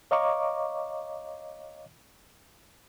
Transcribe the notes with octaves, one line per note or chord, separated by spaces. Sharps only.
C#5 D#5 F5 A#5 C#6 D6